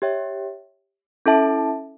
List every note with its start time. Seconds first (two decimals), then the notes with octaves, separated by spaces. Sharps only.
0.02 G4 C#5 E5 G5
1.26 C#4 E4 A4 E5 A5